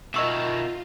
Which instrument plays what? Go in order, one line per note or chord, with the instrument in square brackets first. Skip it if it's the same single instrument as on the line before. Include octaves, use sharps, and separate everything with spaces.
[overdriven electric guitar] B2 D#3 [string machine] F4 [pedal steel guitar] A#4 E5 [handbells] D#5 C#6 E6